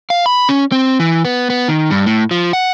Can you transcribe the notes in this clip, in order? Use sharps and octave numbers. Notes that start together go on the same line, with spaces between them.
F5
B5
C#4
C4
E3
B3
B3
D#3
G2
A2
F3
F#5